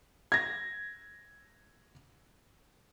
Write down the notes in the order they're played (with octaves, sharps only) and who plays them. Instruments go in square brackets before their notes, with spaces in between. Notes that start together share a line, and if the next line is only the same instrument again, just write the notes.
[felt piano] G#6 A#6